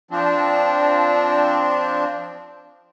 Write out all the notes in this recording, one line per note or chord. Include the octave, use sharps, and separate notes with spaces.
F3 C4 D4